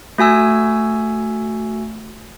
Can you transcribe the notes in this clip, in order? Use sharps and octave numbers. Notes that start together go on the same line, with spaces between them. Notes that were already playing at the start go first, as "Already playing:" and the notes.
A3 F#4 G#5 E6